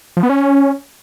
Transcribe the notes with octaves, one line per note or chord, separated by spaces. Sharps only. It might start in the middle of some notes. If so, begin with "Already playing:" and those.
F3
B3
C#4